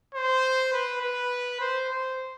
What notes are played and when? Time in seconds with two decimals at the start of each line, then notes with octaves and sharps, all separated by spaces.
0.15 C5
0.73 B4
1.02 B4
1.61 C5
1.89 C5